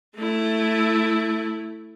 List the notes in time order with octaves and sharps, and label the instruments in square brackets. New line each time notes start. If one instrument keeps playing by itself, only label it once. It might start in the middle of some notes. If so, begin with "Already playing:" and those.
[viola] A3 E4